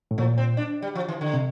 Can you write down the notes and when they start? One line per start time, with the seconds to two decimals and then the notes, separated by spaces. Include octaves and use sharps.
0.11 A2
0.18 A#2 F3
0.38 C4
0.57 D4
0.82 G3
0.95 F3
1.08 E3
1.21 D3
1.34 C3